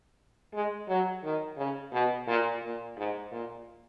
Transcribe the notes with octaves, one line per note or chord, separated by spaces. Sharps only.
G#3
F#3
D#3
C#3
B2
A#2
A#2
G#2
A#2